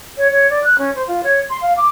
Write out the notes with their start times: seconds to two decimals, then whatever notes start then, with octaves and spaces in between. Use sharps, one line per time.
0.17 C#5
0.30 C#5
0.49 D5
0.64 F#6
0.78 C#4
0.95 C5
1.07 F4
1.23 C#5
1.50 C6
1.61 F5
1.77 D6